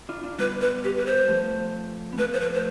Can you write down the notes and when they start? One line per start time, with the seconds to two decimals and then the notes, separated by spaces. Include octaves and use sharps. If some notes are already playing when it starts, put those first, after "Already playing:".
0.09 D4 F4
0.23 D4 F4
0.39 G3 B3 B4
0.61 B4
0.84 G4
0.97 B4
1.06 C5
1.28 F3 A3
2.13 B3
2.18 F3 A3 B4
2.33 C5
2.40 B4
2.54 C5